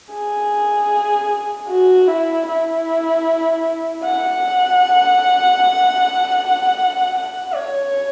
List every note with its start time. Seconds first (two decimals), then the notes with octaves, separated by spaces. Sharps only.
0.13 G#4
1.69 F#4
2.08 E4
2.48 E4
4.04 F#5
7.17 F#5
7.55 C#5